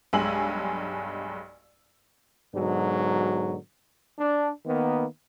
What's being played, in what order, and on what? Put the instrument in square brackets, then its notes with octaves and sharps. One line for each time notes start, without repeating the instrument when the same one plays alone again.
[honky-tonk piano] B1 G2 G#3 G#5 E6 F#7
[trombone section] G#2 B2 D3 F#3
D4
D#3 A#3 B3